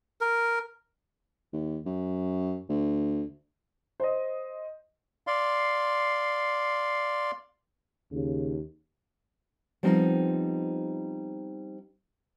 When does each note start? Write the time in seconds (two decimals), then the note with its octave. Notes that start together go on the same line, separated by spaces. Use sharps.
0.21 A#4
1.53 D#2
1.86 F#2
2.69 D2
4.00 C5 D#5
5.27 D5 F5 C6
8.12 D#2 C#3
9.83 F3 G3 B3 C4 D#4 F4